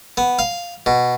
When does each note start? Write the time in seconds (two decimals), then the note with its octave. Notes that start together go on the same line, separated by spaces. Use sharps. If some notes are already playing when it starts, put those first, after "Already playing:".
0.17 B3
0.39 F5
0.86 B2